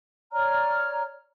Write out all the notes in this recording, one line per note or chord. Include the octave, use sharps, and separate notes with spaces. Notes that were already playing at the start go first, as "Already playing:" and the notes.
C#5 D5 A#5 F6